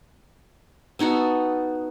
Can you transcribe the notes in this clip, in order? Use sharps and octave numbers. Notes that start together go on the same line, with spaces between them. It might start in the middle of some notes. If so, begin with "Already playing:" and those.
B3 D#4 F#4 A4